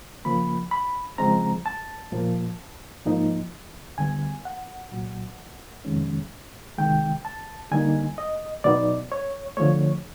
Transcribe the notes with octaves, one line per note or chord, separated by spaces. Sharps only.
C#3 F3 A#3 B5
B5
C#3 F3 G#3 C4 A#5
A5
A#2 F3 A#3
G#2 F3 A#3 D#4
D2 D3 G3 B3 G#5
F#5
C2 A#2 F#3
F2 C3 D#3 G#3 C#4
C2 C3 D#3 G#3 G5
A5
D3 G3 A#3 D#4 G#5
D#5
B2 F#3 B3 D#4 D5
C#5
D3 F3 A3 C#5